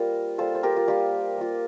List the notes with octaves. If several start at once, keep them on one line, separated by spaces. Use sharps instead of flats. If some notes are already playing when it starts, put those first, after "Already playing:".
Already playing: G3 A#3 F4 A#4 C5
G3 A#3 F4 A4 C5
C5
G4 A#4
F4
G3 A#3 F4 G4
A#3 F4